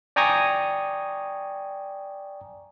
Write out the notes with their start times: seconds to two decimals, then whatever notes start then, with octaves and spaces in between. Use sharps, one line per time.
0.16 D5 G5 G#5 A#5 C#6 D#6